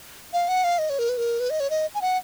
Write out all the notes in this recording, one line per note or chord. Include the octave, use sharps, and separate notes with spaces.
F5
F#5
F5
D#5
C#5
A#4
B4
A#4
B4
D#5
C#5
D#5
G#5
F#5